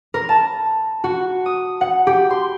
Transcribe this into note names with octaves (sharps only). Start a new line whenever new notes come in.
A#4
A5
F#4
D#6
F#5
G4
C6